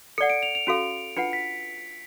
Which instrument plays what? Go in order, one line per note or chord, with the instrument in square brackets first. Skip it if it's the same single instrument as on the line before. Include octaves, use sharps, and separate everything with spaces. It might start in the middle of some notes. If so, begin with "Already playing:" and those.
[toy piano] A4 D5 F#5 [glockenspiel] C#7
[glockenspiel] D7
F7
F7
[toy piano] C#4 F#4 A4 F5 [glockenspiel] D7
[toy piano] D4 F4 B4 F#5 [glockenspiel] C#7
[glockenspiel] B6